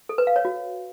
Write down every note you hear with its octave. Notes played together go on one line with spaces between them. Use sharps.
A4
B4
F5
C#5
F#4